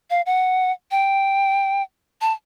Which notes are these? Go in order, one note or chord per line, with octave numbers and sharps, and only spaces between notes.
F5
F#5
G5
A5